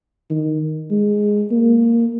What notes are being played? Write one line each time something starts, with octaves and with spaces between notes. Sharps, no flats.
D#3
G#3
A#3